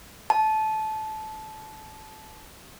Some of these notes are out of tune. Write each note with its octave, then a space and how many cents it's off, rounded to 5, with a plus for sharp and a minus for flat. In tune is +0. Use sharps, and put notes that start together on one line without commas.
A5 -20